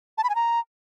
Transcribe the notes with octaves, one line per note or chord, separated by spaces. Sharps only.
A5
B5
G#5
A#5